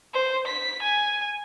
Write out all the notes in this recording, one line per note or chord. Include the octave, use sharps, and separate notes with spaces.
C5
B6
G#5